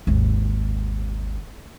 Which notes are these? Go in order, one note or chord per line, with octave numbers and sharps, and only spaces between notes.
G#1 D#2